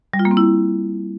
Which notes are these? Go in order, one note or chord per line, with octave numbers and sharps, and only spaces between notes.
G3
F4
A#3
C4
E4